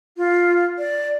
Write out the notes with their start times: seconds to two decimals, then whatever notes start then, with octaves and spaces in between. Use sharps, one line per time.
0.17 F4
0.78 D5